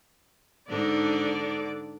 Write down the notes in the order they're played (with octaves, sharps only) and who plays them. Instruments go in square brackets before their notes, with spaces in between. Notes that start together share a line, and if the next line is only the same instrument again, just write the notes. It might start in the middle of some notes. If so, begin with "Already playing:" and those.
[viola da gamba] G#2 D4 D#4 [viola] D3 D5